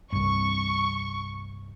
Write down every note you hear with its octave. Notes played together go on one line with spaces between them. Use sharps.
C2 G2 C#6